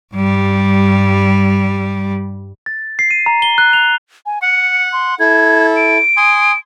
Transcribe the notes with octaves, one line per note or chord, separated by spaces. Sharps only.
G2 G3
A6
C7
D#7
A#5
G7
F#6
F7
G#5
F#5 C#7
C6
E4 A4 G#6
D7
G#5 C6 D#6